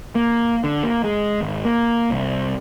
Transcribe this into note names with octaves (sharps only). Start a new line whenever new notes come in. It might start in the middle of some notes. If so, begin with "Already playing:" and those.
A#3
D3
A#3
G#3
G#1
A#3
C2